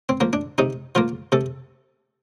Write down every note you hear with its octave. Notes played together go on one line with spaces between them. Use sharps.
C4
F3 A#3
D4
C3 D#4
F3 A#3 F4
C3 A4